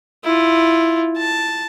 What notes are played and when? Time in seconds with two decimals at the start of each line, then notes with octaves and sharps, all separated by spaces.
0.24 E4 F4
1.18 A5